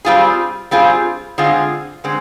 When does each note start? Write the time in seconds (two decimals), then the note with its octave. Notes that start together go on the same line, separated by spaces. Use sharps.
0.05 G3 C4 F4 G#4
0.71 G3 C4 F4 G#4
1.38 D3 G#3 C4 F4 G#4
2.04 D3 G#3 C4